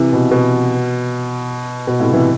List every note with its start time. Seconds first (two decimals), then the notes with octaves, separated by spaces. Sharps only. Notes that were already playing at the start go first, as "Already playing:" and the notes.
Already playing: C3 E3
0.13 B2
0.31 B2
1.87 B2
2.00 A2 C3
2.13 C3 E3